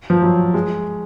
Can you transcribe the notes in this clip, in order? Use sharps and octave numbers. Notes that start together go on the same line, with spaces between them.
F3
F#3
G#3